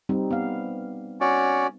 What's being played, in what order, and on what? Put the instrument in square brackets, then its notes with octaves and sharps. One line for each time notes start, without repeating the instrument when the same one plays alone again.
[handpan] G3 C4 D#4
B3 F5
[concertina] C#4 F#4 D5